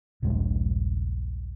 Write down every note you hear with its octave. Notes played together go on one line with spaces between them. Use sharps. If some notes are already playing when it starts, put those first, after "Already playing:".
D#1 A#1 G2 G#3